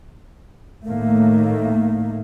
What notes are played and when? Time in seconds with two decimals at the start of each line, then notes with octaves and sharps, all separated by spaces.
0.87 A2 D#3 A3 A#3